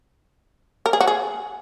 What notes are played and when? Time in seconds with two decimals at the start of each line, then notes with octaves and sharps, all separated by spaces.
0.86 A#4
0.93 G#4
1.01 F#4
1.08 G#4